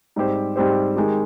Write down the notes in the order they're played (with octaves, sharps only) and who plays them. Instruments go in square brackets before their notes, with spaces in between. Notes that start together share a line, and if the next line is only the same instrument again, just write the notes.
[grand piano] G#2 G3 C4 G4 C5
G#2 G3 C4 G4 C5
D#3 G#3 D#4 G4